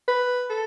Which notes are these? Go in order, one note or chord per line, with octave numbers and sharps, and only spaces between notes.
B4
A4